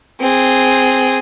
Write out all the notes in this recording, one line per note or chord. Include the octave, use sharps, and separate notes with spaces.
C4 G#4